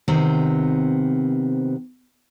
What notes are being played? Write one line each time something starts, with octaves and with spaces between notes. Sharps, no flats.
C3 D#3 B3 C4